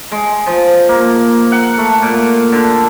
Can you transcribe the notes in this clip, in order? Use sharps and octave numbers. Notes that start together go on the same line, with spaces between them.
G#3
F3
A#3
F#5
A3
A#2
D3